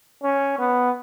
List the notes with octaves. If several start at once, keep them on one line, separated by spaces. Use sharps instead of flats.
C#4
B3